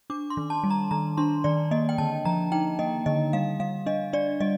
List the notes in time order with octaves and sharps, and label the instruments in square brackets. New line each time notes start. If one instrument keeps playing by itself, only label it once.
[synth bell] D4 D6
C6
D#3
A5
G3
A#5
D#3 A#5
D4 C6
D#3 D5
A#3 D#5
G5
D3 A5
F3 A#5
D#4 G5
A#3 D#5
D3 D#5
G3 F5
G3 F5
D4 D#5
D4 D5
G3 D#5